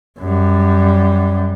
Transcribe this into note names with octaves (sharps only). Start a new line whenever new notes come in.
F#2 G3